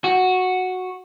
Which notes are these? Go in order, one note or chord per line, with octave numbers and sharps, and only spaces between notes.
F#4